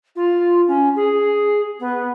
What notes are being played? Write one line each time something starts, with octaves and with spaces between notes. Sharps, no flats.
F4
C#4
G#4
B3